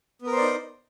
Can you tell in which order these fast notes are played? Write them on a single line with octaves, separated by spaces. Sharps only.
B3 A#4 C5 D5 D#4